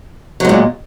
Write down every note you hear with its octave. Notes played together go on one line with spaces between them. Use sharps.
A#2 F#3 G#3